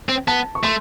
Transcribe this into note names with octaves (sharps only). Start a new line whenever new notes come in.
C4
B3 A5
C#6
A3 C6